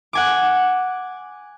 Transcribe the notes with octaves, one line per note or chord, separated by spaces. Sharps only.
F#5 G#5 D6